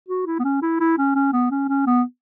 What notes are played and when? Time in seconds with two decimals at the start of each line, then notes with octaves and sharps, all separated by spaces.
0.08 F#4
0.26 E4
0.39 B3
0.44 C#4
0.62 E4
0.80 E4
0.98 C#4
1.15 C#4
1.33 B3
1.51 C#4
1.68 C#4
1.87 B3